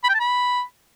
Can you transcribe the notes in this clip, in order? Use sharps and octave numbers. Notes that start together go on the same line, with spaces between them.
B5
G5
A5
B5